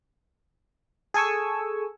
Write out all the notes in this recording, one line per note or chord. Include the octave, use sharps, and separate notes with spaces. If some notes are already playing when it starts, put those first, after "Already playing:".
G#4 A4 G#5 C#6 E6